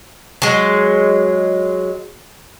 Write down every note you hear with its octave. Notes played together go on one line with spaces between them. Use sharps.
F#3 G#3